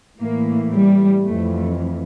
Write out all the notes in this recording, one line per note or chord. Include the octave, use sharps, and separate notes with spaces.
A2 E3 A#3
G3
F2 E3 A3